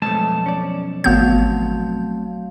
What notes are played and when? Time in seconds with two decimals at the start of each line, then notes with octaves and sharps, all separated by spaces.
0.02 B1 F2 G#3 A3 A5
0.46 C#4 D5
1.04 G#1 F#3 A3 B3 C4 F5 G6